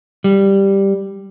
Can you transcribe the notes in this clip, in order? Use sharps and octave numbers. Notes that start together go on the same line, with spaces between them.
G3